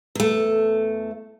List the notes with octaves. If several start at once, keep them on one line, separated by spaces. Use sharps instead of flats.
E2 A3